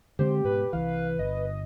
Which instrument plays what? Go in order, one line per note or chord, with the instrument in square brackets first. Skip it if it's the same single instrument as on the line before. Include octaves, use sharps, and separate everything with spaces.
[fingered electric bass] D3 G#3 C4 [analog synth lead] G4 [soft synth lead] C5
[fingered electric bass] G#2 B2 [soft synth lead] B4
[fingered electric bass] C2 E3 [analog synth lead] F5
[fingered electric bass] G1 [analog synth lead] D#5